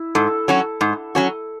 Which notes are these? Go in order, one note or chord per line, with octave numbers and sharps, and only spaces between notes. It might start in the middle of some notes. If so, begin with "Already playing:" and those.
Already playing: E4
G#2 A4
F#3 C#4 F#4
G#2
F#3 C#4 F#4